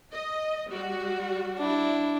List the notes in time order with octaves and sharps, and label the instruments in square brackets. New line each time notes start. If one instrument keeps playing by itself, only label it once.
[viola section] D#5
G3 F#4
[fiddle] D4 E4